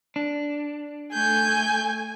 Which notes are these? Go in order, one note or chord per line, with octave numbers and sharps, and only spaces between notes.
D4
A3 G#5 G6